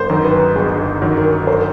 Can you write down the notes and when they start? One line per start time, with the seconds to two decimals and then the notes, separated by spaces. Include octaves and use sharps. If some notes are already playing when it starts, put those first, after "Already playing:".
Already playing: G1 C5
0.09 F#2 D#3 F#3
0.24 B4
0.55 G1 G#4
1.02 F#2 D#3 F#3
1.17 A#4
1.47 C5